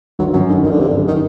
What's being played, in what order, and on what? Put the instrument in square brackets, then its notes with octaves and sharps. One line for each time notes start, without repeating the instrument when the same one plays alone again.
[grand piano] G1 [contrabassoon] F#3
[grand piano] F#2 [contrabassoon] F#3
[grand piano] D3 [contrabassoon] D#3
[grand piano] G1 [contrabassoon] D#3
[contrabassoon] D3
[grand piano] G1 [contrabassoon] C3
[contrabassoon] D3
[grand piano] F#2
[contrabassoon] D#3